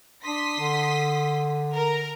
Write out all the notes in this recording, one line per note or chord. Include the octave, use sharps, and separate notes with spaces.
D4 C6 D#6 B6
D3
A#4 A#5